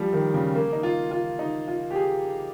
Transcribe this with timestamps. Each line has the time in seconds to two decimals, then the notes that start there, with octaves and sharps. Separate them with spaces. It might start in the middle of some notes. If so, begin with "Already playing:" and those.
Already playing: F3 G3
0.13 D#3
0.34 C#3
0.55 A#3
0.73 D#4
0.83 F4
1.11 F4
1.39 D#4
1.68 F4
1.91 G4
1.96 G#4